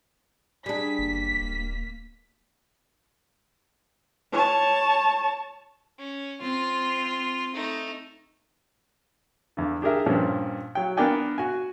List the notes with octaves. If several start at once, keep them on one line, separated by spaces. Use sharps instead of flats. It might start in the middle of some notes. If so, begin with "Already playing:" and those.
G3 D4 G#4 B6
F#1 A#3
D1
C#5 A5
C#4
C4 F4
A3 D#4
E2 D3
D4 G4 G#4 A#4 E5
G2 A#2 F3 C#4
F#3 G5
B3 D4 A#4 D5 G5 G#5
F#4 G#5